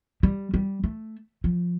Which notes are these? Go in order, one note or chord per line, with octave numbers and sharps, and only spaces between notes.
G3
G3
A3
F3